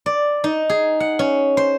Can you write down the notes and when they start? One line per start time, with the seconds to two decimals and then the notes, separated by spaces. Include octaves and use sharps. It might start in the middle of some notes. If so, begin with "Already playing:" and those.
0.06 D5
0.44 D#4
0.70 G#4
1.00 F#5
1.19 C#4
1.57 C5